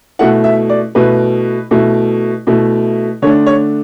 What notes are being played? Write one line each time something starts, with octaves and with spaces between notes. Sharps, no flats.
B2 A3 E4 F#5
E5
D5
B2 A3 E4 B4
B2 A3 E4
B2 A3 E4
D3 A3 D4 C#5
C#5